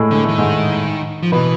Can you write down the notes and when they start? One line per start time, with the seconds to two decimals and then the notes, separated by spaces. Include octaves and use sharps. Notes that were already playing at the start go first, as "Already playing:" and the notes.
Already playing: A2 G#3 A3
0.11 D3 G#3
0.24 D#3 A3
0.38 G#2 G#3
1.23 F3
1.32 B2 E3 B3